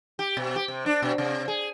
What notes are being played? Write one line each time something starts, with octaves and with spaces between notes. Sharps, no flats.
G4
B2
G4
C3
D4
B2
C3
G#4